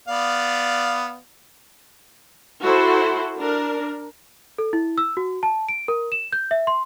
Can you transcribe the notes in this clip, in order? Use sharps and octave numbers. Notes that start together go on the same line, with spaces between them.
B3 D5 F5
E4 F#4 A4 C5
D4 A#4
A4
E4
E6
F#4
A5
D7
A#4
E7
G6
E5
C6